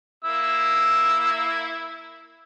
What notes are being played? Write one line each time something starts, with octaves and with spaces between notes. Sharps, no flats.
A#3 E4 E6